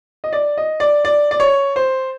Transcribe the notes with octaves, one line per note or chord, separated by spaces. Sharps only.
D#5
D5
D#5
D5
D5
D5
C#5
C5